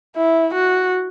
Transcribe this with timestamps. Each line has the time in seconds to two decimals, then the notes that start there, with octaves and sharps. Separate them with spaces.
0.16 E4
0.54 F#4